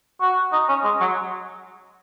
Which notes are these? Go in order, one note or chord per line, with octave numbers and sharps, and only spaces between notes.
F#4
D#4
C#4
G#3
F#3